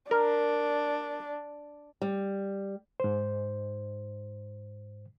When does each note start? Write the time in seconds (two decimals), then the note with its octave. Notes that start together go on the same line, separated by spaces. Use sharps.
0.11 D4 A#4
2.02 G3
3.00 G#2 C5